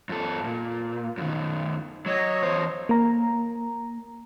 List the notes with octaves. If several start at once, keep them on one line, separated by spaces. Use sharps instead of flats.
F#2 A4
A#2
F#2 D#3
F#3 C#5 D#5
E2 C5
A#3 A#5